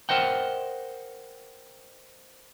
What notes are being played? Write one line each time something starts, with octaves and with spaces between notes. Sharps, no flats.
A#4 C5 D#5 F#5 G5